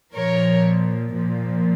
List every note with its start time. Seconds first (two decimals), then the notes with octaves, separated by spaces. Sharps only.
0.15 A#2 F3 A#4 C#5
1.13 A#2 F3